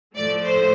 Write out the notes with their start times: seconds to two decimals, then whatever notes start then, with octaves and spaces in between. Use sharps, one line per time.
0.15 A2 F3 A3 D5
0.44 C5